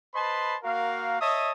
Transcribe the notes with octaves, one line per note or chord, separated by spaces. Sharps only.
B4 C5 D#5 A5 B5 C6
A#3 F#4 A#4 F5
C#5 D#5 E5 A5 D#6